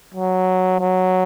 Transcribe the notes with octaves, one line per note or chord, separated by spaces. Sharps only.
F#3
F#3